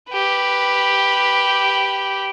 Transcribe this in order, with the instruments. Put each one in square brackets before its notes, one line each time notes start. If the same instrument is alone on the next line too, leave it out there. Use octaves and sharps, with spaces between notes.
[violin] G4 B4